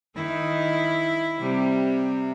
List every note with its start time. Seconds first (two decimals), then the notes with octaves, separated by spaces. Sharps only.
0.16 D#3 D#4 E4
1.39 C3 G3